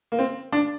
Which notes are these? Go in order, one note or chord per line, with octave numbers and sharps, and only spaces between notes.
A#3
C4
D4